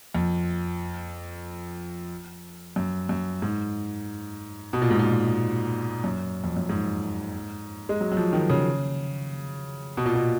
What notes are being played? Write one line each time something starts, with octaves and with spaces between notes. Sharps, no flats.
F2
F#2
F#2
G#2
B2
A#2
G#2
A#2
F#2
F2
F#2
G#2
G#3
F#3
F#3
F3
D#3
C#3
B2
A#2
B2